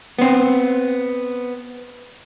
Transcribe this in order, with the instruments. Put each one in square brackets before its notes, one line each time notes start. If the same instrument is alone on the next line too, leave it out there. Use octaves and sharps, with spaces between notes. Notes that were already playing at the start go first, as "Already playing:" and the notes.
[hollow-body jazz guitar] B3 C4